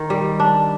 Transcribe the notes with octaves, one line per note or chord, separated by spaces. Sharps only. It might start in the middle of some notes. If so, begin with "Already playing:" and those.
Already playing: D#3
G3
D4